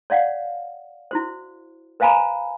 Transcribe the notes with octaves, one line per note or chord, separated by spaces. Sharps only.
C#5 D5 F5 F#5
E4 F#4 C5
B4 C5 F5 G#5 A#5 B5